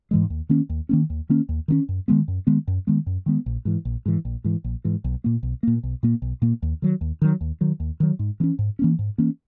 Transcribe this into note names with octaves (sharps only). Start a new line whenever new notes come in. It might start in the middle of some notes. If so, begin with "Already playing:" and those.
G#2 E3 G#3
D#2
D#3 A#3 C#4
D#2
D#3 A#3 C#4
D#2
D#3 A#3 C#4
D#2
D#3 A#3 C#4
F#2
D#3 G#3 B3
F#2
D#3 G#3 B3
F#2
D#3 G#3 B3
F#2
D#3 G#3 B3
A#1
G#2 E3
A#1
G#2 E3
A#1
G#2 E3
A#1
G#2 E3
B1
A#2 A#3
B1
A#2 A#3
B1
A#2 A#3
B1
A#2 A#3
D#2
D#3 F#3
D#2
D#3 F#3
D#2
D#3 F#3
D#2
D#3 F#3
G#2
E3 A#3 C#4
G#2
E3 A#3 C#4
G#2
E3 A#3 C#4